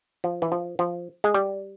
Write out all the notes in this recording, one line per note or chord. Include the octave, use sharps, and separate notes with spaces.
F3
E3
F3
F3
G#3
G3